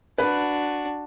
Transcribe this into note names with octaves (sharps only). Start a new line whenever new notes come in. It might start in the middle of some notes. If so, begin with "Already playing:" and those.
D4 F#4 B4